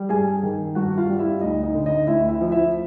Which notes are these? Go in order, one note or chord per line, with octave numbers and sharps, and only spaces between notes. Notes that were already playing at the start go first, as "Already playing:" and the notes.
Already playing: G3
G2 G#4 G#5
D#3
G2 F#4 F#5
F4 F5
G3
E4 E5
D2 D#4 D#5
D#4 D#5
D3
D#4 D#5
D2 E4 E5
E4 E5
F3
E4 E5